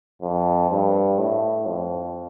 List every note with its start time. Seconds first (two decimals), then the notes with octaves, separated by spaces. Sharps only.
0.22 F2
0.71 G2
1.19 A2
1.67 F2